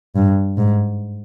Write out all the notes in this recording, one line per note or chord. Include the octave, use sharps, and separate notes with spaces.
G2
G#2